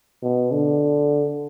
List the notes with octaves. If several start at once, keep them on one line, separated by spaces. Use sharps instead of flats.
B2
D3